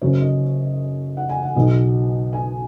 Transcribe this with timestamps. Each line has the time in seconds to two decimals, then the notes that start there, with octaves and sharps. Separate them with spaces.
0.01 F#1 F#2 F#3 C#5
0.21 D#5
1.17 F#5
1.29 G#5
1.43 F#5
1.55 B1 B2 F#3 D#5
2.33 G#5